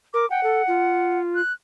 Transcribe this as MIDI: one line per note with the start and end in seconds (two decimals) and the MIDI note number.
0.14 0.26 70
0.14 0.28 86
0.30 1.19 78
0.30 0.41 79
0.43 0.62 69
0.68 1.41 65
1.35 1.53 90